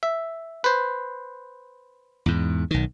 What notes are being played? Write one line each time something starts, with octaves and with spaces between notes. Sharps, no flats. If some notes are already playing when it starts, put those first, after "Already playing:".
E5
B4 C5
E2 G#2
B1 D#3